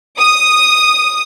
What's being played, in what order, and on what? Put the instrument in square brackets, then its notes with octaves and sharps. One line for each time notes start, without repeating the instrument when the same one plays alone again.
[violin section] D#6